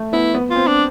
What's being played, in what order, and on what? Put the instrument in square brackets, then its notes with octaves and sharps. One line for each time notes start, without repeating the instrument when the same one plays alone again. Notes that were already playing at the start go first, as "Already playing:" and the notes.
Already playing: [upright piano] A3
[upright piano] B3 [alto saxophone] E4
[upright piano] B3
[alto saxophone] F4
[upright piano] C4
[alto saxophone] D4